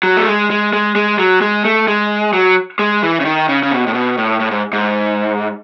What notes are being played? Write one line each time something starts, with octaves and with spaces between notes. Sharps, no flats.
F#3
A3
G#3
G#3
G#3
G#3
F#3
G#3
A3
G#3
F#3
G#3
E3
C#3
D#3
C#3
C#3
B2
A2
B2
A2
A2
G#2
G#2